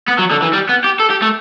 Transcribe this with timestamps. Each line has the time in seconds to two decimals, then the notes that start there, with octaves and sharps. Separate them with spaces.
0.08 B3
0.19 F#3
0.31 D3
0.43 E3
0.53 G3
0.69 B3
0.84 G4
0.99 A4
1.10 G4
1.22 A3